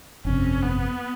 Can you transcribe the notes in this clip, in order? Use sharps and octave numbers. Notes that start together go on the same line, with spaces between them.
G1 F2 C3 C#4
B3